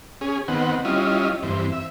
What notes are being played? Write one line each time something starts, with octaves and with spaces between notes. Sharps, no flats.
C#4 G#4
D#3 B3 C4 F#5
G3 C#4 E4 F4 D#5
G2 E3 C4
E5